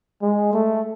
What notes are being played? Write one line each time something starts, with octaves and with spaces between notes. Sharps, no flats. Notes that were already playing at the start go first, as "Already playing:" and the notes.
G#3
A3